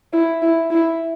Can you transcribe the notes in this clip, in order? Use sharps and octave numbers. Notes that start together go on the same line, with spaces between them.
E4
E4
E4